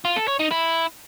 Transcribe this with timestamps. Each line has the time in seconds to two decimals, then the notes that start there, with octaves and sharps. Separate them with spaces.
0.05 F4
0.16 A4
0.28 C#5
0.39 D#4
0.51 E4